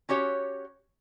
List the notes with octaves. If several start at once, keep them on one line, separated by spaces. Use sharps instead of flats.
C#4 F#4 G4 C#5